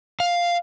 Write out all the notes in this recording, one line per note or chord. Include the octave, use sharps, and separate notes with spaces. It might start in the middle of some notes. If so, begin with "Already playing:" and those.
F5